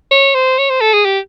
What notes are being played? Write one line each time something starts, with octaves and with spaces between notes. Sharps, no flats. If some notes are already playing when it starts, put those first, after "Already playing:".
C#5
C5
C#5
C5
A4
G#4
G4